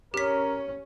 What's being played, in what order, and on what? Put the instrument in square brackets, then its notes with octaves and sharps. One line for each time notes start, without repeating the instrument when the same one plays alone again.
[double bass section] C#4 [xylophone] G4 B6 [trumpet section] A#4